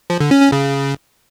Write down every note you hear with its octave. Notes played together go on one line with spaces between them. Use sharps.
F3
D3
C#4
C#4
C#3